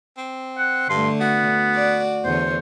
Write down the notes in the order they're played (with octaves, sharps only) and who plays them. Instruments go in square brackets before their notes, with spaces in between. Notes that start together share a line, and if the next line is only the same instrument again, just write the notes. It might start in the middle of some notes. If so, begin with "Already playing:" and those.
[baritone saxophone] C4
[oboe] F#5
[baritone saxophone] G2 [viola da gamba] D3 A3 [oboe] C6
[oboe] B3 [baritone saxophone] F#4
[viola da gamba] D5
[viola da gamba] E2 D3 C#5 [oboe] C5